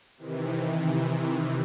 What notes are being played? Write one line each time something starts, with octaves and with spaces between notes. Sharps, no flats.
C3 D#3 E3